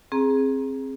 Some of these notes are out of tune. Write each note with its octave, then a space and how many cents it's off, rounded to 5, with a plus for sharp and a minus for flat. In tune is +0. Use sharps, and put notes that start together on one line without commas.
C4 +20 G#4 +0 A#5 +15